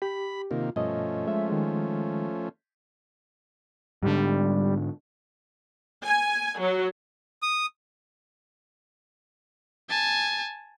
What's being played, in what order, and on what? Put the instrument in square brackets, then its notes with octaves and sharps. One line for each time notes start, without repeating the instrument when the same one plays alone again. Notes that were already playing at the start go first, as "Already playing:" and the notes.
[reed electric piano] G4 [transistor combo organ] B5
[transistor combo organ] C3 D#3 A#3 [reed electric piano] F4
[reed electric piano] G2 B2 D#5 [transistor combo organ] F3 A3 C#4
[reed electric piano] G#3 E5
D#3 G#3
[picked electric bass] G#2 D3 [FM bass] G3
[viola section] G#5
F#3
[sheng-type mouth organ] D#6
[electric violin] G#5 A5